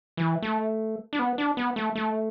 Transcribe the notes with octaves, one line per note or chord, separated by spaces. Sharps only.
E3
A3
D4
B3
D4
B3
A3
A3